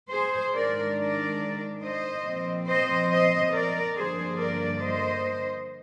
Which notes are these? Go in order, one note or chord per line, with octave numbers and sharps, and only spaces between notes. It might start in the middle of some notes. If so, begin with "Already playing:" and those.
G#4 C5
G#2 D#3 G#3 D4 A#4 D5
A#4 D5
C5 D#5
A#2 F3 C4
C5 D#5
C5 D#5
A#4 D5
G2 D3 F3 A#3 D4 G#4 C5
A#4 D5
C5 D#5